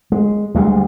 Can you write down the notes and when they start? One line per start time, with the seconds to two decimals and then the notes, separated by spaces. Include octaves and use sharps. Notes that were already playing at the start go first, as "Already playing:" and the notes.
0.12 G#3
0.55 D2 G3 G#3